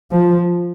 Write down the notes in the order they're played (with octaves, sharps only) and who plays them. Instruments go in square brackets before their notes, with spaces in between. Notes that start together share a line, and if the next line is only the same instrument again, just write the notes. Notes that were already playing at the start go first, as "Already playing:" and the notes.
[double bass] F3